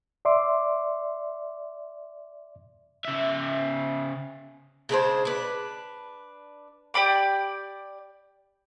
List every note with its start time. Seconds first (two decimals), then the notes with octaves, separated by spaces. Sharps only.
0.25 D5 E5 C6 D6
3.05 C#3 E5
4.89 C#3 G#3 D4 C5
5.25 D4 B4
6.94 G4 D5 B5 D6